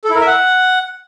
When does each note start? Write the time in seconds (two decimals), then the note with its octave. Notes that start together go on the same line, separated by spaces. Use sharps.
0.04 A4
0.10 E4
0.16 A#4
0.21 E5
0.27 F#5